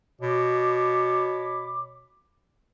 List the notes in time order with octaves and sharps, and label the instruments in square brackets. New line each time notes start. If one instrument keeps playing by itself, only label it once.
[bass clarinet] B2 [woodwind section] C#5 B5 D6